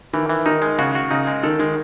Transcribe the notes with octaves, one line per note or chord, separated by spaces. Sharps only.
D#3 E3
E3
D#3 D#4
G#3
C#3 F#4
F#4
C#3 D#4
G#3
D#3 A4
D#3 G#3